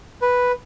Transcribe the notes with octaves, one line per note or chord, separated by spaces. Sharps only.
B4